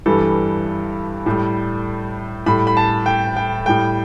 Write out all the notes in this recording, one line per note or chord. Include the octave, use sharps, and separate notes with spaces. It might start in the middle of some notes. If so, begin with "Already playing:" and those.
G2 E3 G3 A4
A2 G3
A2 G3 B5
B5
A5
G5
G5
A2 G3 G5